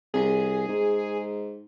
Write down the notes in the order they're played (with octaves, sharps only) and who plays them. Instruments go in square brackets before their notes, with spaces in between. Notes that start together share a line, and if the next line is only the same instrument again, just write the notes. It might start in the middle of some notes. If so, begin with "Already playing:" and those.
[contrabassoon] C2 [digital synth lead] G#4
[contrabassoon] G#2